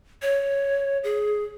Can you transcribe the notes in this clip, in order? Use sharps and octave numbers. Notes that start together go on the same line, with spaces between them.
C#5
G#4